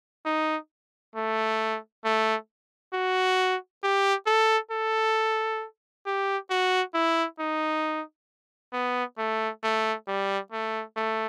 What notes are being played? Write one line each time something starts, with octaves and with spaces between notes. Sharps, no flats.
D#4
A3
A3
F#4
G4
A4
A4
G4
F#4
E4
D#4
B3
A3
A3
G3
A3
A3